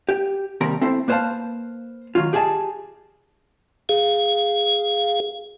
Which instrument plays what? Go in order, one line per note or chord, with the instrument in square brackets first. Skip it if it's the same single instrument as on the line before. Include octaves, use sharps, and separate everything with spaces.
[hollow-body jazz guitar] G4
D#2 C3 G3 A#4 A#5
C4 E4 A4 C5
A#3 B4 C5 E5 F5 A5
D#3 F#3 F4
G4 G#4 D#5 F5 A5
[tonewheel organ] G#4 F5